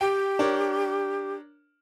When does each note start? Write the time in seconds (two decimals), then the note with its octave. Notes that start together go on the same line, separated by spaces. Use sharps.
0.01 G4 G5
0.39 D4 A#4 C#5